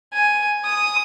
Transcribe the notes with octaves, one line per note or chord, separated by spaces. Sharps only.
G#5
D#6